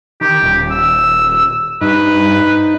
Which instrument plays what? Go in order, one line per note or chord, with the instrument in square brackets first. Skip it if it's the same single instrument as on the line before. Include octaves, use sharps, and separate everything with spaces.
[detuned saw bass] D#3 [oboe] G4
[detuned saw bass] D#1
[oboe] E6
[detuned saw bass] G2 [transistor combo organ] D#4 [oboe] B4